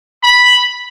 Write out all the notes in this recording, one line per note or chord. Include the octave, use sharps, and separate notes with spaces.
B5